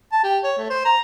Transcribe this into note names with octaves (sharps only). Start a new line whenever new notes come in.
A5
G4
C#5
A3
C5
A#5